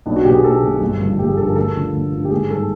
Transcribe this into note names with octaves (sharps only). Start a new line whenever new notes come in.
B1 D4
F#4
B2 G4
G#4
B1 A4
B2
G1
G2 D3 F3
G1 G4
G#4
G2 D3 F3 A4
A#4
D2 A4
D3 F3
D2
D3 F3
G4
G#1 G#4
G2 D#3 A4